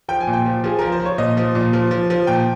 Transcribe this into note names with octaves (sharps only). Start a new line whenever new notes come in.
F3 G5
G#5
A#2
G5
F3
F3 G#4
F3 A#4
C5
F3
C#5
A#2 D#5
F3
A#2
F3
F3
F3
A#2 G5